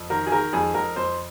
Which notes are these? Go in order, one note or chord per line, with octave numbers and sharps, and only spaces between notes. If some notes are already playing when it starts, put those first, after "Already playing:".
Already playing: F2
D#3 A#4
G#4
D#3 A#4
F2 G#4
F2 A#4
F2 C5